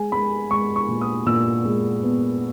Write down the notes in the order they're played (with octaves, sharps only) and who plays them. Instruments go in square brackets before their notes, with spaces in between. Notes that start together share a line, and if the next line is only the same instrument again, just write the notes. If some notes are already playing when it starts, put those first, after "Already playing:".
Already playing: [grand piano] G#3 G#5
G#3 B5
G#3 C#6
C#6
A#2
D#6
A#2 E6
G#3
B3